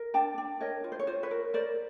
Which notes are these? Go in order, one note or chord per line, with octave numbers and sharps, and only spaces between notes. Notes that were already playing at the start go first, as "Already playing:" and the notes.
Already playing: A#4
D4 G5 A5
D4
A#4 C#5 D#5
F4
C5
C#5
F4 C5
B4 C#5
A#4
A#4 C5 D5